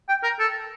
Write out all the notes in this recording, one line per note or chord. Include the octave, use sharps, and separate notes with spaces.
G5
A#4
A4